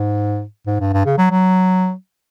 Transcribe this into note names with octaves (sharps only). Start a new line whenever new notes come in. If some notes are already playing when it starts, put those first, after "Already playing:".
Already playing: G#2
G#2
G2
G2
C#3
F#3
F#3